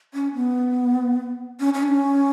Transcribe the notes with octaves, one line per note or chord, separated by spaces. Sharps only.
C#4
B3
C#4
C#4
D4
C#4